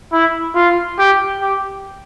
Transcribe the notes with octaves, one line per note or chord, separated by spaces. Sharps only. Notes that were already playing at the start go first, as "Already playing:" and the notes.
E4
F4
G4
G4